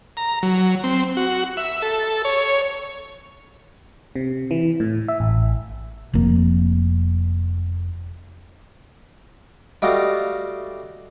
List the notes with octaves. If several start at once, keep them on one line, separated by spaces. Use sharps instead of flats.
A#5
F#3
C4
F#4
E5
A4
C#5
C3
E3
A2
E5
A1
F1 F2 F3 A#3
G3 A3 F#4 D5 D#5 F5